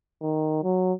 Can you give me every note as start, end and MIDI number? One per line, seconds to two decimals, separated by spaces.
0.22 0.61 51
0.63 0.93 54